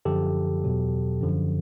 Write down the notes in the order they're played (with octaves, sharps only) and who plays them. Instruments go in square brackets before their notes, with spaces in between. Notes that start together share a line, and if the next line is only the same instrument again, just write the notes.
[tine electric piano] F#2 D3 F3 G4 A4
E2 B2 F#3
F#2 D3 F3